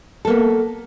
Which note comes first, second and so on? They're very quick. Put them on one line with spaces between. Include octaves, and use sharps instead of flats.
A4 A#3 B3